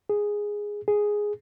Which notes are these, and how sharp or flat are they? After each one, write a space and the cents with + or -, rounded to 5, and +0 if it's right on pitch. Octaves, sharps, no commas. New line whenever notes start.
G#4 -5
G#4 +0